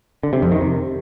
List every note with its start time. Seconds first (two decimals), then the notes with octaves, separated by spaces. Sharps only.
0.23 D3
0.33 C3
0.42 F2
0.52 D#3
0.61 C3